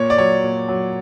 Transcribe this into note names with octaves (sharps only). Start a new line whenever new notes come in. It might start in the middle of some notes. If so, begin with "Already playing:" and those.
Already playing: A#2 C#5
D5
F#3 C#5
A#2
F#3